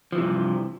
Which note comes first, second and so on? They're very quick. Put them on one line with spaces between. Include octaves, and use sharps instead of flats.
F3 E3 C3 G2